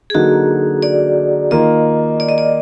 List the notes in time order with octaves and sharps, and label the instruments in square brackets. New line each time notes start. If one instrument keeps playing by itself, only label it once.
[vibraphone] G#4
[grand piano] D3 F#3 A#3 D#4 [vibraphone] F#4
[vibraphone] D5
[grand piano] D#3 A#3 F4 [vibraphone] D#5
[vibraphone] D5
D#5
D5